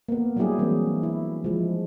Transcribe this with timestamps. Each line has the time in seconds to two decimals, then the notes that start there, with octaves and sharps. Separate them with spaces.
0.08 A#3 B3
0.37 F#3 G3 D4 E4 G4 G#4
0.59 E3 F#3 G#3 A#3 C4
1.03 E4
1.44 F3 G#3